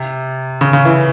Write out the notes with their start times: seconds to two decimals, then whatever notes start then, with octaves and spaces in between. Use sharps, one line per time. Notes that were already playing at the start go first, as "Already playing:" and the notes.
Already playing: C3
0.61 C#3
0.73 C#3
0.85 E3